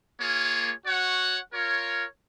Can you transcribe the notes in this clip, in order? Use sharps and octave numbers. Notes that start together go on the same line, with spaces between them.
A#3 F4 G#4 C#5
F#4 C#5 F#5
F4 A#4 C#5